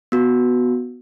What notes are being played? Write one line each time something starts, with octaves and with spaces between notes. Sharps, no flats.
B3 F#4